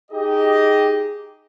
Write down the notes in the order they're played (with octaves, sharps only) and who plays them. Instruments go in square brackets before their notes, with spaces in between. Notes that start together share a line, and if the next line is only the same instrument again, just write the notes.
[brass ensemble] D#4 G4 G#4 D#5